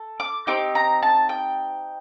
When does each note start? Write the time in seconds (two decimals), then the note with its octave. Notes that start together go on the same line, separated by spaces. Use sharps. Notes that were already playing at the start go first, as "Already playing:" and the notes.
Already playing: A4
0.20 D6
0.47 C4 D#4 G4 D6
0.75 A#5
1.03 A5
1.29 G5